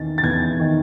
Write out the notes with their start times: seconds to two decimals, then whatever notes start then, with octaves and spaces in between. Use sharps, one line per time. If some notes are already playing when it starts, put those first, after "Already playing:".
Already playing: E2 D#3 A6
0.18 A6
0.23 E2 G#6
0.59 D#3